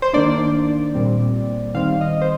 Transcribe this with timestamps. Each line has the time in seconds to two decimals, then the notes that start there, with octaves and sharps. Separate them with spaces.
0.02 C5
0.13 D#3 A#3 D4 D5
0.94 A#2 G3 C4
1.75 D#3 G3 C4 F5
2.01 D#5
2.22 C5